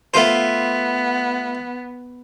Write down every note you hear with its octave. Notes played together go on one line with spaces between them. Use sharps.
A3 B3 F4 C5